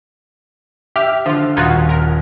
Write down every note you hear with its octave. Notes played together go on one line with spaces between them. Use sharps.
G4 E5 F6
D3 F3 F4
D#1 D#4 F4 F#4 G#6
A#4